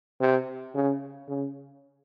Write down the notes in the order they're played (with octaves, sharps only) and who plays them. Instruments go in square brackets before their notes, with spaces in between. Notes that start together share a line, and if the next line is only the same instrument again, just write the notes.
[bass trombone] C3
C#3
C#3